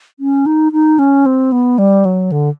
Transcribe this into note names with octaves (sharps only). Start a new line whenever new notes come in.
C#4
D#4
D#4
C#4
C4
B3
G3
F#3
D3